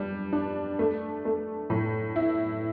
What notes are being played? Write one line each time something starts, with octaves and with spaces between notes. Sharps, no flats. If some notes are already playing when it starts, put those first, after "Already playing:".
Already playing: G3 D4
D4
A3
A3
A2
E4